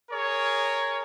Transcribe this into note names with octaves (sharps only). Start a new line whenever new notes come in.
G#4 A#4 C#5